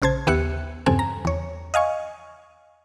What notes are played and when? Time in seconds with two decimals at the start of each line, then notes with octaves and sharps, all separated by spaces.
0.02 A#1 C#3 C5 A5 G#6
0.27 D#2 B3 G4 E5 F#6 C#7
0.86 E2 G2 C#3 C4 A4 G#5
0.99 A#5
1.25 E2 C#5
1.74 D#5 F5 G#5 C#6